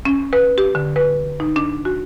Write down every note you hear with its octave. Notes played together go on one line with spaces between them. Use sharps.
C#4
B4
G4
D3
B4
D#4
D4
F#4